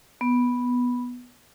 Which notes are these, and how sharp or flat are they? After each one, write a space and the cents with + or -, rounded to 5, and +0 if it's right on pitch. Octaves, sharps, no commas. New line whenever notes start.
B3 -5